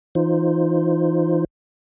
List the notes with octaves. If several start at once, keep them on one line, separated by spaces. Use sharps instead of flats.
E3 D#4 F4 C5